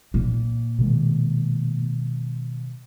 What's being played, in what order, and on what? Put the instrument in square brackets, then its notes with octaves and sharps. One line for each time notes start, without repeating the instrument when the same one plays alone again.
[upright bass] A#2
[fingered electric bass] B2 D#3 G#3